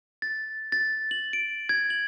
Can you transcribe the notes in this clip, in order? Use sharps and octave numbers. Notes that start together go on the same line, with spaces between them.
A6
A6
F#7
D7
G#6
F#7